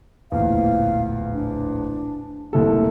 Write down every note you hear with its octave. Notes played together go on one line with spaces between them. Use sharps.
D1 A#1 E2 F5
D4
F1 C2 A#3 A4